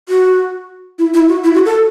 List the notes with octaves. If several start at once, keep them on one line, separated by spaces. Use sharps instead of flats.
F#4
E4
E4
F#4
E4
F#4
A4